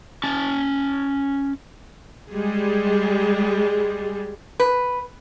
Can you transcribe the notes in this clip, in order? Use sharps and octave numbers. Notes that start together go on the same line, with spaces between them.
C#4 A5
G3 G#3 G#4
B4